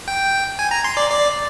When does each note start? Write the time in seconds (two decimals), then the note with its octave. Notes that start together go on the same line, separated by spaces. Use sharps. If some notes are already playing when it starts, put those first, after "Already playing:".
0.08 G5
0.59 G#5
0.71 A#5
0.84 C6
0.97 D5
1.10 D5